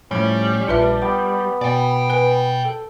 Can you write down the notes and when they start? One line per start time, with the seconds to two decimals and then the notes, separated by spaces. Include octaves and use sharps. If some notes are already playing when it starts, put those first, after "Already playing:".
0.11 A2 F3 G3 A3 C#4
0.68 A#1 D4 F4 B4 E5
1.02 B3 G5 D6
1.61 B2 D5 G5 G#5
2.10 B4 G#5
2.65 A4